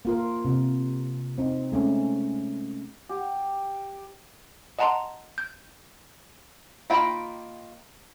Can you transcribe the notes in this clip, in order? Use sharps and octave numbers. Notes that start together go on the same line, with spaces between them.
A#3 F4 A#4
C3
C4 D#4
G#3 A3 C#4
G4
D#5 F#5 A5 A#5 C6
G6
D#3 A#3 F4 G5 B5